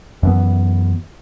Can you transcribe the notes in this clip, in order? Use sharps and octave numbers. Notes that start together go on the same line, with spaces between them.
F#2 E3 B3